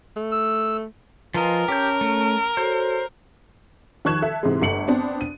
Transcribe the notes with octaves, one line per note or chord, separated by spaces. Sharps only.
A3
E6
F3 F4 A#4 B4 D#5 G#5
C#4 G4 C#5 A5 G6
A3
F#4 A4 C5 C#5
D#3 F3 C#6 F#6 G#6 E7
A4 E5
G#2 C3 E3 G#3
G1 A3 C#7 F#7
B3 C4 D4
D#7